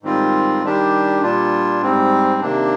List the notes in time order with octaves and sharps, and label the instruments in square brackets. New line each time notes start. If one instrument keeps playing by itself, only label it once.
[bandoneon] G#2 D#3 G3 C4 F4
D#3 G3 D4 G4
A#2 G3 D4 F4
G#2 G3 C4
C3 D#3 A#3 D4